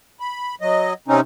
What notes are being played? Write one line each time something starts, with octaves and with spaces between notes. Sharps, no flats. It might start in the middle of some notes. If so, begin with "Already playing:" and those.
B5
F#3 D#5
C3 C4 C#4 D#4